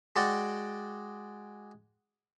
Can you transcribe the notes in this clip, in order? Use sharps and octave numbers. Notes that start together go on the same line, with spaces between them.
G#3 F#4 D5 G5